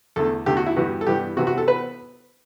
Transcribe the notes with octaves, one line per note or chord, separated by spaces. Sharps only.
E2 D3 A3 A4
E2 D3 A3 G4
F#4
E4
G2 E3 G3 B3 F#4
A4
G2 E3 G3 B3 G4
C3 E3 B3 F#4
F#4
A4
B3 B4